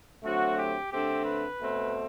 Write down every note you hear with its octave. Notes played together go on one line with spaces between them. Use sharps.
D3 F#3 A3 C4 F#4
G4
D3 A3 C4 G4
B4
B2 A3 C4